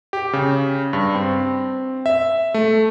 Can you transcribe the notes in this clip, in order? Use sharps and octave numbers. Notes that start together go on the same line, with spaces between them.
G4
C#3
G2
C4
E5
A3